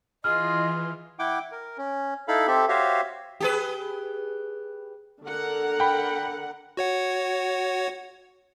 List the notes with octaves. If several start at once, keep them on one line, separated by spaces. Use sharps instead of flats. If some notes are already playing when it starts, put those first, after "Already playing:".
E3 F4 G#4 D#5 F6
E4 F#5 G5 D6
A#4
C#4
D#4 E4 A4 F5 B5
C4 G4 A4 E5
F#4 G4 C5 C#5 E5 F5
G4 G#4 B4
D3 A#4 F#5
G5 B5
F#4 C#5 F#5